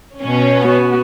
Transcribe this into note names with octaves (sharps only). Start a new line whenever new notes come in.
B2 C#4
B3 F#4